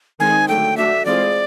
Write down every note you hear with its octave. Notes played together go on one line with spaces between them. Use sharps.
D#3 G#3 C4 D#4 G#4 G#5
D3 F#3 A3 G5
A3 D4 F#4 E5
E3 G#3 C4 F4 G#4 D5